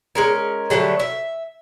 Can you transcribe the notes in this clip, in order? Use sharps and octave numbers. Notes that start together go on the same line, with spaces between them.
G#3 C#4 A#4
D3 F#3 G3 A3
E5